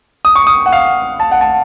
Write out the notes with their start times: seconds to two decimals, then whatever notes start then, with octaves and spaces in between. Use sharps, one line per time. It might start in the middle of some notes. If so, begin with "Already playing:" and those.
0.25 D#6
0.36 C#6
0.47 D#6
0.66 F#5
0.73 F5
1.20 A5
1.31 F#5
1.41 A5